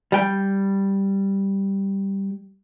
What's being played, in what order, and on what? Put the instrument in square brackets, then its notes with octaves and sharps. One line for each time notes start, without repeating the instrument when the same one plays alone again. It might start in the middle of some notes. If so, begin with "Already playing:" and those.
[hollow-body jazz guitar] G3 G5